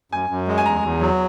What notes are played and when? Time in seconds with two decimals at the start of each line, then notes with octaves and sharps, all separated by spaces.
0.12 F#2 G#5
0.30 F#2
0.48 G#3
0.58 G#5
0.66 E2 A#5
0.83 E2
1.01 F#3